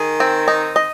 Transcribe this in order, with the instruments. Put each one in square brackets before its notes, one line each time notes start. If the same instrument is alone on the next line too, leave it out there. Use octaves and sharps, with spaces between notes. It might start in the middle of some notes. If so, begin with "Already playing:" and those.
Already playing: [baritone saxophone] D#3 [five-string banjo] G#4
[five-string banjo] C4
D#4
D#5